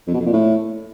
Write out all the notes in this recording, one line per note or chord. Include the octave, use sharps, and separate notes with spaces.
F2
B2
F2
A#2
A2